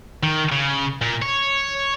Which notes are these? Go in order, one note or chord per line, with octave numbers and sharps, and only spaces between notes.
D#3
C#3
A#2
C#5